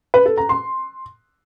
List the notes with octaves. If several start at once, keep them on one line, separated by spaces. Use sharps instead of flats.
B4
A4
A#5
C6